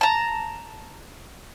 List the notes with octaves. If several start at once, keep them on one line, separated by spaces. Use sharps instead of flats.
A5 A#5